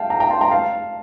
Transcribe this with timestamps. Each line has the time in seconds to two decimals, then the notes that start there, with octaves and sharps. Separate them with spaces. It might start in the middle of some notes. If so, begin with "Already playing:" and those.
Already playing: F5 G5 A5
0.10 G5 A#5
0.20 G5 A#5
0.30 A5 C6
0.41 G5 A#5
0.51 F5 A5